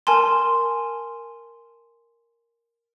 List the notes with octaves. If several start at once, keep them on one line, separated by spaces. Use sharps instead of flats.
A#4 G#5 A5 C6